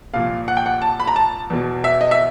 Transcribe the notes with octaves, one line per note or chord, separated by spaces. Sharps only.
C2 A#2 F3 F5
F#5
G5
F#5
A5
B5
A#5
A5
E2 B2
E5
D#5
E5